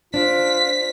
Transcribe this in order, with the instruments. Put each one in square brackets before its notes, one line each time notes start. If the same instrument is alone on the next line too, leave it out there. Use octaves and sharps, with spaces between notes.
[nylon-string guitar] D4 [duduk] F4 [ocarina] C5 [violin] B6